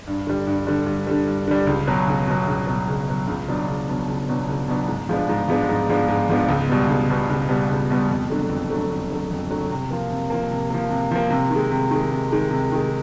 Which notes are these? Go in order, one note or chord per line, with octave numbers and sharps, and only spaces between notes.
G2
D3 G3
G2
D3 G3
G2
D3 G3
G2
D3 G3
C#2
B2 F#3
C#2
B2 F#3
C#2
B2 F#3
C#2
B2 F#3
C#2
B2 F#3 B3 D4
C#2
B2 F#3 B3 D4
C#2
B2 F#3 B3 D4
C#2
B2 F#3 B3 D4
G#2
F3 G#3 B3 D4
G#2
F3 G#3 B3 D4
G#2
F3 G#3 B3 D4
G#2
F3 G#3 B3 D4
C#2
B2 G3 B3
C#2
B2 G3 B3
C#2
B2 G3 B3
C#2
B2 G3 B3
F2
D3 F#3 A3
F2
D3 F#3 A3
F2
D3 F#3 A3
F2
D3 F#3 A3
C3
F3 A#3
C3
F3 A#3
C3
F3 A#3
C3
F3 A#3
C3
D#3
G#3
C3
D#3 G#3
C3
D#3 G#3
C3
D#3 G#3